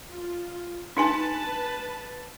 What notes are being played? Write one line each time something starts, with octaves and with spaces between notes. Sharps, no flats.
F4
D4 D#4 B4 G#5 A5